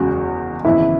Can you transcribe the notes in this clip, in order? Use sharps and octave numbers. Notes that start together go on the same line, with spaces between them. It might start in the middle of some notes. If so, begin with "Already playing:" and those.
Already playing: F#1 E2 C#3 G#3 F#4
G#1 F#2 C#3 E3 B3 E4